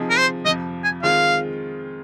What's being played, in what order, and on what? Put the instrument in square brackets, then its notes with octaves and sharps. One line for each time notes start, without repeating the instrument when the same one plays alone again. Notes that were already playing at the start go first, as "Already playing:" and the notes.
Already playing: [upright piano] C3 F3 C4 D#4 G#4
[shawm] A#4
C5
[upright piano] F2 C3 F3 [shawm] D#5
[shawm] G#5
[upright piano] D#3 G#3 C4 F4 G#4 [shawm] F5